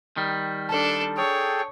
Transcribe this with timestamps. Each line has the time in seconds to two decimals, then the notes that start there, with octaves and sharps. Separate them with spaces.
0.17 D#3 G3
0.69 D4 A4 A5
1.17 G#4 A4 C#5 G5